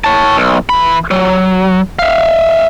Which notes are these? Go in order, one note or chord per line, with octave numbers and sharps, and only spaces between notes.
C#5 A5
B1
E3 B5
F#3
E5 F5